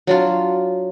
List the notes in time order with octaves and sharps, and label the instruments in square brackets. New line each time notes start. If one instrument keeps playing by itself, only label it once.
[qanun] F#3 D4 F4